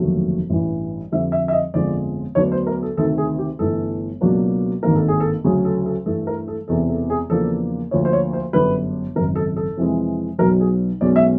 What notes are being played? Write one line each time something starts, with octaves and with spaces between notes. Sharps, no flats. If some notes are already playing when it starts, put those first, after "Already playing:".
Already playing: F1 D#2 D3 F#3 A3
A1 G2 E3
F2 D3 G3 E5
E5
E5
D#5
G1 F2 D3 F3 G#3 D5
D2 D3 F#3 B3 D4 C#5
C5
A#4
A4
D2 C3 D#3 A4
G#4
G4
G1 G2 E3 A3 A4
C#2 B2 F#3 A#3 D4
G#1 G2 D#3 G3 A#3 A#4
A4
G#4
A4
D2 C#3 F#3 A3 C#4 G#4
A4
A4
G2 E3 A3 A4
A#4
A4
E1 E2 C3 A4
A4
G#4
E2 C#3 F3 A#3 D4 A4
D2 D3 F3 A#3 C#5
C5
C#5
C5
G1 F#2 D3 G3 B4
G#1 F#2 C#3 A#4
A4
A4
F2 C3 E3 G#3 C4
B1 B2 F#3 A#4
G#4
B1 B2 G#3 C#4 D5
E5